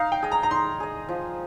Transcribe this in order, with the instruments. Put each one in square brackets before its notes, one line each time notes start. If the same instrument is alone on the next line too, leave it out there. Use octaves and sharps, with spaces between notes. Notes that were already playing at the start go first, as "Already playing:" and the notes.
Already playing: [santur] D#4 [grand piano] F5
[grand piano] G5
[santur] G#4 D#5
[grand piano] A#5
A#5
[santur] D#4 [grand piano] C6
[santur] G#4 D#5
F3